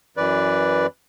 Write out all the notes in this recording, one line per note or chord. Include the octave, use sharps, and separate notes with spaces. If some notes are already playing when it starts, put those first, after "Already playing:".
F#2 E3 B4 D5